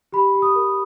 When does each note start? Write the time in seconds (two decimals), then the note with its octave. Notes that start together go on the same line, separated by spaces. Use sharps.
0.13 G4 B5
0.35 G4
0.42 D#6
0.55 A#4